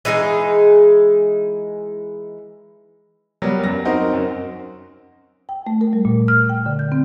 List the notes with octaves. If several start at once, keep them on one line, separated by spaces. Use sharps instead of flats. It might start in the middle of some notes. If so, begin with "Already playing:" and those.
E3 G#3 D#4 G#4
F#3 G3 B3 A#4
F#2 A#6
C4 D#4 F#4 A#4 C5
F#2
G5
A3
A#4
G3
A#2
F6
G5
D3
G6
C4